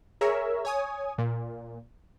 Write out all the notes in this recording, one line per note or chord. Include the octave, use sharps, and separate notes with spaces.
G#4 A#4 C#5 E5
C#5 G#5 D#6
A#2